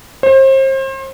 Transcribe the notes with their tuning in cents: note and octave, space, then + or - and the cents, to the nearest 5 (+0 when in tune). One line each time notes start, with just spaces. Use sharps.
C5 +35